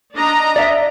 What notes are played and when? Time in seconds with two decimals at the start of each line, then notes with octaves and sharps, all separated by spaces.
0.14 D4 D#5 A#5
0.56 D5 E5